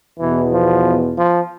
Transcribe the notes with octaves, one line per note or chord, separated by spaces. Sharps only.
E2 B2 E3
F3
F3